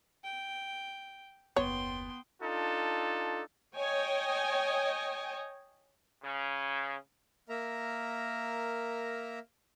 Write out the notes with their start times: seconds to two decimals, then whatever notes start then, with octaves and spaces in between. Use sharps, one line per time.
0.24 G5
1.56 F#1 D#2 B3 C#5 G5 C6
2.42 D4 D#4 F4 A4
3.76 C#5 D#5 G5 G#5
6.24 C#3
7.49 A#3 A#4 E5 A#5